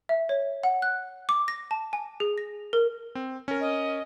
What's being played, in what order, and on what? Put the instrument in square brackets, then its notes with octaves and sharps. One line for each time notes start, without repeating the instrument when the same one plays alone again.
[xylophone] E5
C#5
F#5
F#6
D6
A#6
A5
G#5
G#4
A#6
A#4
[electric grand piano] C4
C#4 A#4
[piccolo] D#5